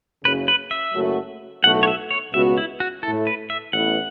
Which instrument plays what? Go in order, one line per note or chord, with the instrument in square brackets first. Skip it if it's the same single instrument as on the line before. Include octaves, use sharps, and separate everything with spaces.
[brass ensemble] F#1 F#2 C#3 [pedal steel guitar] B4
[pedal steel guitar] B4
E5
[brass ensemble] F#1 F#2 F#3 A3 F#4
[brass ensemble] B1 A2 A3 F#4 [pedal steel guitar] F#5
[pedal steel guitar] C#5
E5
C#5
[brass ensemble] C#2 B2 B3 F#4 [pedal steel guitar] E5
[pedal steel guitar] E4
F#4
[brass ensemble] A2 A3 E4 [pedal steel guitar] A4
[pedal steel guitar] B4
E5
[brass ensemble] A1 A2 E3 B3 E4 [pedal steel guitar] F#5